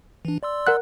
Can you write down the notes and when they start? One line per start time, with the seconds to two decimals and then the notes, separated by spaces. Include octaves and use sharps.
0.25 E3 D4
0.43 D5 C6 E6
0.67 A#4 F#5 F#6